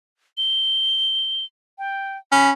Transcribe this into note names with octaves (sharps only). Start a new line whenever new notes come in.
G7
G5
C#4 B5